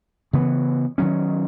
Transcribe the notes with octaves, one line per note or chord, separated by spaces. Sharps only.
C#3 E3 B3
D#3 F#3 C#4